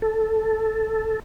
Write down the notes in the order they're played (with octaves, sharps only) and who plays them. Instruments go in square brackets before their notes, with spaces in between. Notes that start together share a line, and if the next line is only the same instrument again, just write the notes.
[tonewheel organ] A4